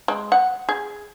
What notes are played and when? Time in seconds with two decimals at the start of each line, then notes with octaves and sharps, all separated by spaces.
0.08 G#3
0.32 F#5
0.69 G#4